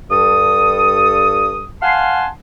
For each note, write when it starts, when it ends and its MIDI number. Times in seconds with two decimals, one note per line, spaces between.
0.11 1.65 43
0.11 1.65 69
0.11 1.65 87
1.82 2.27 77
1.82 2.27 78
1.82 2.27 80
1.82 2.27 81
1.82 2.27 84